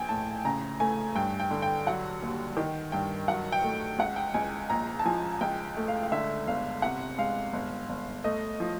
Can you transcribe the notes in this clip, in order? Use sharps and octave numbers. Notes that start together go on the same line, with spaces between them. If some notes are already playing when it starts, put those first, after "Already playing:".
Already playing: A#1 G5 G#5
A2 A5
C#3 A#5
A3 G#5
G2 G5
G5
D3
G5
F#3 F#5
D#2
D#3 G5
G2 G5
F#3 F#5
G5
A3
C#2 F#5
G5
C#2 G#5
A#1 A#5
A5
F3 G#5
C#2 G5
A3
F5
F5
D3 E5
G1 F5
C3 F#5
G#3 F5
G1
G1
A3 D#5
F3